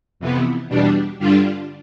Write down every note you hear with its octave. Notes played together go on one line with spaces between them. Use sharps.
F2 C3 E3 B3
E2 B2 G3 D4
G2 D3 G3 D4 F4